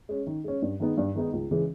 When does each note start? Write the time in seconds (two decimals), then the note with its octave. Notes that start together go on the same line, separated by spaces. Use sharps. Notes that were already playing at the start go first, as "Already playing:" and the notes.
0.09 G#3 C#4
0.27 D#3
0.44 G#3 C#4
0.62 G2
0.80 D#3 G#3 B3 D#4
0.98 G2
1.15 D#3 G#3 B3 D#4
1.33 C#2
1.51 C#3 E3 G#3